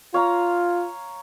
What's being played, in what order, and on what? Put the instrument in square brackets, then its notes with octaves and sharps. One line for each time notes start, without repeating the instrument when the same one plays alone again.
[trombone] F4 [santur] C#5 F5 A#5